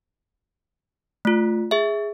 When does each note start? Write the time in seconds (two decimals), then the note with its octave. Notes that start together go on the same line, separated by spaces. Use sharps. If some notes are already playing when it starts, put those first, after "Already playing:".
1.25 A3 F4
1.71 G#4 E5